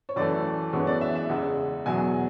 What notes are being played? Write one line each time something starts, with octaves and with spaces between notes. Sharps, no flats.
C#5
F#2 E3 A3 D5
F#2 E3 G#3 B3 D4 C#5
D5
E5
E5
E2 C#3 G#3
E2 B2 F#3 G#5